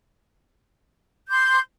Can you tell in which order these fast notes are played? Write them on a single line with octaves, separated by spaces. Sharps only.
G6 D6 C6